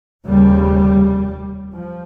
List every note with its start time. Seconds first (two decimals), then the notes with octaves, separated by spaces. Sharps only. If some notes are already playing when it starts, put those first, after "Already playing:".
0.25 F1 D#2 C#3 G3
1.74 F3